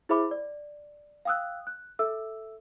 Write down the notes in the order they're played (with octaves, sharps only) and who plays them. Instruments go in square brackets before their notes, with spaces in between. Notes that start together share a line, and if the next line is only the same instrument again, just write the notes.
[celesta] E4 G#4 C5 E5 B5 D6
D5
F5 G5 D#6 E6 F#6
F#6
A4 E5 E6